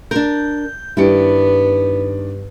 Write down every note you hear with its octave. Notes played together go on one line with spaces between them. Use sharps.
D4 A#4 G6
G2 D#3 B3 D4 E4 G4 C#7